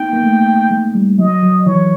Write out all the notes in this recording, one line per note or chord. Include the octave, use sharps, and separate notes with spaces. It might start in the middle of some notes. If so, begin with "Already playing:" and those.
Already playing: A#3 B3 D#4 G5
A#3
A3
G#3
G3
F#3 D#5
F#3
E3 C#5